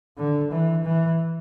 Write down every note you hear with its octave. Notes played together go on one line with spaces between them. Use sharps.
D3
E3
E3